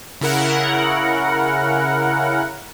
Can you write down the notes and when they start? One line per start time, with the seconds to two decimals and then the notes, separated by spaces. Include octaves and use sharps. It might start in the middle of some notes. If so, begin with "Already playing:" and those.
0.21 C#3 E4 A#4 F#5